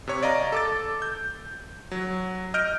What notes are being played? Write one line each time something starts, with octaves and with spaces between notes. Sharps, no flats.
C3 C#5 C#6
D5 D#5 F5 A#5
A4 D6 A6
G6
F#3
D#5 F6 G6 D7